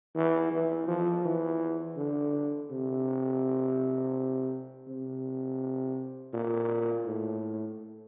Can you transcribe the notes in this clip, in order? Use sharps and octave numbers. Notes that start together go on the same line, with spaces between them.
E3
E3
F3
E3
D3
C3
C3
A#2
A2